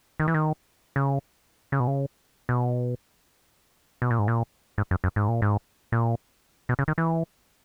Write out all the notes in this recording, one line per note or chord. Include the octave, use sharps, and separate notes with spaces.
D#3
E3
D#3
C#3
C#3
B2
C#3
B2
B2
A#2
G#2
A#2
G#2
F#2
F#2
G#2
A#2
G#2
A#2
B2
C#3
D#3
E3